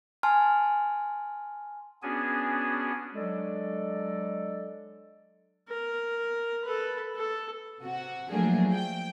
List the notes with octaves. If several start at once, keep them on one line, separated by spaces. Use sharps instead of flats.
G#5 A5 C6 F6
B3 C#4 D4 F#4 G#4 G#5
F#3 G#3 D4 A4 D5 D#5
A#4
A4 B4
A4
C3 F#4
F3 F#3 A3 A#3 D4 G#4
G5